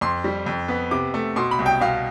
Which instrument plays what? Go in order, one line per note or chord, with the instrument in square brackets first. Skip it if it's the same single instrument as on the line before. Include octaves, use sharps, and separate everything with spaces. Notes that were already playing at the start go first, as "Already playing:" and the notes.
[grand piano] F2 C6
G3
F2
B3
C3 D6
A3
B2 C6
B5
C2
G5
B2 F5